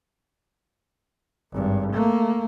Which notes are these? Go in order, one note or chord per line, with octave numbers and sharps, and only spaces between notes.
G#1 G2
A3 A#3